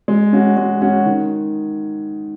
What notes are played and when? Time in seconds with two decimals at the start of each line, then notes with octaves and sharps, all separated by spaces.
0.08 G#3
0.33 C#4 F#4
0.57 G#3
0.82 C#4 F#4
1.06 D#3